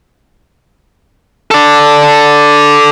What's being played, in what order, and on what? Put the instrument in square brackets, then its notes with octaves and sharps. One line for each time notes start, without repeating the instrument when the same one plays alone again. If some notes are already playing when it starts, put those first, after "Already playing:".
[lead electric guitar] A4 D5